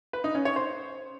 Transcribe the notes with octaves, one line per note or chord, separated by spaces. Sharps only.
B4
D#4
C#4
C#5
C5